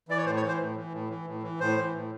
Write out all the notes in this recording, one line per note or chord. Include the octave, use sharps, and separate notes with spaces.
E3 D5
C#5
A2 C5
C#5
E3
C5
A2
E3
A2
E3
A2
E3
A2 C5
E3
A2